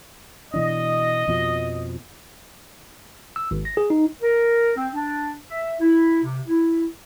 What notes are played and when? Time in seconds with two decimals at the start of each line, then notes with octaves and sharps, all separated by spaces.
0.54 B2 E3 D4 D#5
1.28 F2 B2 F3
3.36 E6
3.51 G#1
3.65 A#6
3.77 G#4
3.90 D#4
4.21 A#4
4.76 C4
4.94 D4
5.49 E5
5.80 E4
6.24 C3
6.47 E4